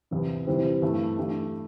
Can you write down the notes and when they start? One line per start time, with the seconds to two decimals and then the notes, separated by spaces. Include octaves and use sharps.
0.11 E2 C3 E3
0.47 C3 E3 G3 C4
0.82 G2 E3 A3
1.18 E3 A3 D4 G4